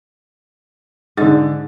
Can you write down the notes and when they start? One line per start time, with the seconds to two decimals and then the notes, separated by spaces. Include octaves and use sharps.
1.17 G#2 D3 A6